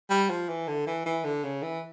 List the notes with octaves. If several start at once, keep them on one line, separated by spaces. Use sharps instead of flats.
G3
F3
E3
D3
E3
E3
D3
C#3
E3